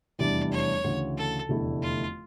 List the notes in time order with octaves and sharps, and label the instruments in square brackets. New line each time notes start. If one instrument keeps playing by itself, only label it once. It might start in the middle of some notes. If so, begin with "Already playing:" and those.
[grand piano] F1 E2 E3 G3 D4 [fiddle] D5
[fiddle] C#5
[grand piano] D2 C#3 E3
[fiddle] A4
[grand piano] F1 E2 D3 A3 E4
[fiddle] F4